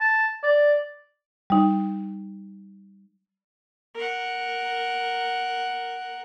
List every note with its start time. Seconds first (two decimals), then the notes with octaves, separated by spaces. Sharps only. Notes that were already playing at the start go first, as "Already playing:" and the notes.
0.01 A5
0.43 D5
1.50 G3 D#4
3.95 A#4 F#5